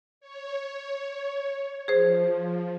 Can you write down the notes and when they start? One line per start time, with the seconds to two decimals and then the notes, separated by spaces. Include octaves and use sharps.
0.21 C#5
1.88 F3 G#4 C5